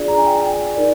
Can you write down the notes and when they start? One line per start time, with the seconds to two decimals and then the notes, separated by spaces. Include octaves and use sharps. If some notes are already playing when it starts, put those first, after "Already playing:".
Already playing: D4 F4 G#4 D5
0.08 A#5
0.18 G#5
0.26 G5
0.36 G#5
0.75 D#4 A#4 D5